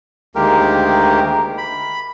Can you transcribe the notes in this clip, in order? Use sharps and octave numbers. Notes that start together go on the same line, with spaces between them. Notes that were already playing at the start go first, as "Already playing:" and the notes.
D2 D#3 G#3 A#3 G4 A#4
B5